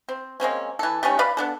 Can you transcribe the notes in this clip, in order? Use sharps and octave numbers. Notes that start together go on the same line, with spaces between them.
C4
G#3 A#3 C4 C#4
E3 A4
G3 A3 C#4 D#4
B4 D5 F5 B5
B3 D4 A4